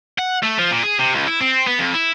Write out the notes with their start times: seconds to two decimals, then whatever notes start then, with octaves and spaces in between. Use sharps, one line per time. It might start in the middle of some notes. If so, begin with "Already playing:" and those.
0.19 F#5
0.43 A3
0.59 F3
0.71 A#2
0.83 G#4
0.99 C3
1.13 C#2
1.27 E4
1.41 C4
1.68 B3
1.79 F2
1.94 E4